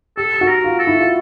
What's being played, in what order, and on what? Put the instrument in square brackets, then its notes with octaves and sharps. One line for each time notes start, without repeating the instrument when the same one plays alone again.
[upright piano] G4 [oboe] A4
[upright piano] F#4
[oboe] A#4
[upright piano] F4
[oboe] A4
[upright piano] E4
F4